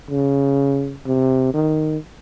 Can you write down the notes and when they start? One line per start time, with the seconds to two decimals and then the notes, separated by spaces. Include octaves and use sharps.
0.10 C#3
1.06 C3
1.54 D#3